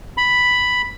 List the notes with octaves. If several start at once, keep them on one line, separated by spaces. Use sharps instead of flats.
B5